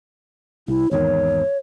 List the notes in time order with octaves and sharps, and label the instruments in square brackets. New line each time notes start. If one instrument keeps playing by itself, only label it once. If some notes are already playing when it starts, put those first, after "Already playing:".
[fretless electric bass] C2 [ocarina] E4
[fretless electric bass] G#1 E2 D#3 [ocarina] C#5